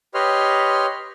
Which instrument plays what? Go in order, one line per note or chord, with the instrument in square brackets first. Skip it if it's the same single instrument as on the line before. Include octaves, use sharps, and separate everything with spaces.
[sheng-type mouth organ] G4 B4 C#5 D#5 C6 F6